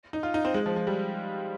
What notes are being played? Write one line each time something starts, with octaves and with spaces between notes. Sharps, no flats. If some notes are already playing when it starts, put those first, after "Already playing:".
D#4
F4
D#4
C4
G#3
F3
F3
G3